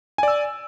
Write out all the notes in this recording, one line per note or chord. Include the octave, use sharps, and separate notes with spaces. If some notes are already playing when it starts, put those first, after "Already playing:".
D5 G#5 E6